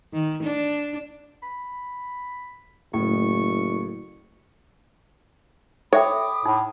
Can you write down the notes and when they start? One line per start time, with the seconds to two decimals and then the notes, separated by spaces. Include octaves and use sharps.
0.13 D#3
0.43 D4
1.43 B5
2.94 F#1 A2 C#6
5.93 A4 C#5 E5 G5 B5 D6 D#6
6.45 A2 D#4